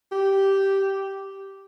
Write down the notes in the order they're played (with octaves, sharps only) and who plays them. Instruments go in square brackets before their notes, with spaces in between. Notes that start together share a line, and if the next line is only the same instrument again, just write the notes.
[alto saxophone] G4